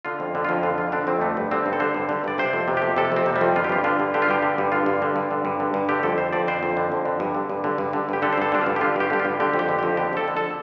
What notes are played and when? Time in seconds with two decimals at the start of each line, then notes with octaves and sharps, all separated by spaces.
0.05 D3 F4
0.20 F2
0.35 D3
0.44 F2 F4
0.63 D3 F4
0.78 F2 F4
0.92 D3 D4
1.07 F2 C4
1.21 D3 A3
1.37 G2
1.51 D3 C4
1.66 G2
1.73 A4
1.80 D3 C5
1.94 G2
2.09 D3
2.24 G2 D5
2.38 C3 C5
2.53 F2 A4
2.68 C3
2.77 F2 G4
2.96 C3 A4
3.12 F2 C4
3.26 C3
3.36 G3
3.41 F2
3.56 D3 F4
3.64 G4
3.70 G2 F4
3.84 D3 F4
4.00 G2
4.14 D3 G4
4.22 F4
4.29 G2 G4
4.43 D3
4.58 G2
4.72 D3 F4
4.86 G2
5.02 D3
5.16 G2
5.31 D3
5.45 G2
5.60 D3
5.74 G2
5.89 D3 G4
6.03 F2 A4
6.18 D3 C5
6.33 F2 D5
6.47 D3 C5
6.63 F2
6.77 D3
6.92 F2
7.05 D3
7.20 G2
7.35 D3
7.49 G2
7.64 D3
7.78 G2
7.93 D3
8.09 G2 G4
8.22 D3 A4
8.33 C5
8.38 G2 A4
8.52 D3 D4
8.61 F4
8.66 G2
8.76 G4
8.81 D3 F4
8.96 G2 G4
9.10 D3 G4
9.19 F4
9.25 G2
9.40 D3 G4
9.54 F2
9.59 G4
9.69 D3
9.79 F2 G4
9.97 D3 G4
10.13 F2 A4
10.28 D3
10.37 A4